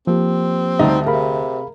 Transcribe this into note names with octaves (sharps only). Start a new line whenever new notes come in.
F3 A#3 C4 G4
D2 G3 A3 D#4 D#5
C3 G#4 A#4 F5 B5